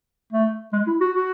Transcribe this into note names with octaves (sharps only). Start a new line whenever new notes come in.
A3
G#3
E4
F#4
F#4